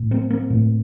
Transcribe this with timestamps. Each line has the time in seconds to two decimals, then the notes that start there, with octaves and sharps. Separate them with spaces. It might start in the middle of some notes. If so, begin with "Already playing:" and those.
Already playing: A2
0.11 A#3 C4
0.30 A#3 C4
0.50 A2